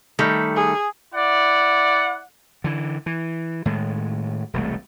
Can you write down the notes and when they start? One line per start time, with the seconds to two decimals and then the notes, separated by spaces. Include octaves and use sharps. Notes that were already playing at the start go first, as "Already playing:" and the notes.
0.19 D#3 G3 A3
0.56 G#4
1.13 E4 D5 F#5
2.64 D3 E3
3.06 E3
3.65 A2 D#3 G#3
4.54 E1 C2 A3